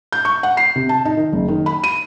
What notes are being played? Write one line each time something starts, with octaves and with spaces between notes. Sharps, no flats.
G6
C#6
F#5
C7
C3
A5
D#4
D#3
F#1
D#3
B5
D#7